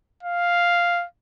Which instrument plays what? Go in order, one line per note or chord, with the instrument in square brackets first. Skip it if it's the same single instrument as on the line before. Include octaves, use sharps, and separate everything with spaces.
[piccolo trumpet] F5